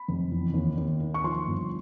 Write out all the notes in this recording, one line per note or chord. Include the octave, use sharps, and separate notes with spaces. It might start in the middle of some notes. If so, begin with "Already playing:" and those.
Already playing: B5
F1
E2
D#2
D#2
D#3
C#6
F3 C6
G1